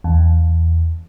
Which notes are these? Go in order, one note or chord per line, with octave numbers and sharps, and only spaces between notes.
E2